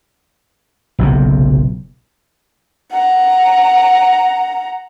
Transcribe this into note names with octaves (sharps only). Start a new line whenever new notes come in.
F#1 B1 C3
F#5 A#5